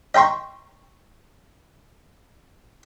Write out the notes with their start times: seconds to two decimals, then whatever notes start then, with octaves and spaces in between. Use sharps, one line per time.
0.15 D#5 G5 A#5 C6 C#6